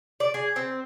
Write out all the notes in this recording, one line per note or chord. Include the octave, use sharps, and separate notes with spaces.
D5
G#4
C4